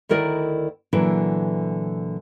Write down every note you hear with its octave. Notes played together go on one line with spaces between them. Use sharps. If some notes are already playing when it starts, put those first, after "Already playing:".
D2 D#3 E4 A#4 D5 D#5
A#2 D3 E3 F#3 E4